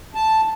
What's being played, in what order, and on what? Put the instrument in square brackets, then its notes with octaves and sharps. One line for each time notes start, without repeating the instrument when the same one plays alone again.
[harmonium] A5